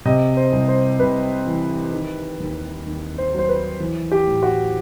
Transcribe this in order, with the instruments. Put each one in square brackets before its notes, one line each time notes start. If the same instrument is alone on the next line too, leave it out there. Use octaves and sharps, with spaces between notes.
[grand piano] C3 D#5
C5
C2
C5
C2 B4
E3
D#3
D#2
D#2
C5
F#3
C5
B4
E3
G4
A2
F#4